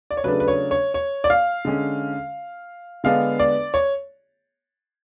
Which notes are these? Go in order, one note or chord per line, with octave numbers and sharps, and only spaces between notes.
D5
C#5
C#3 F#3 A3 D4 B4
B4
C#5
C#5
C#5
D5
F5
D3 G#3 C#4
D3 G#3 B3 D4 F5
D5
C#5